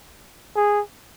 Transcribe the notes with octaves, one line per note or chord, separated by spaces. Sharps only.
G#4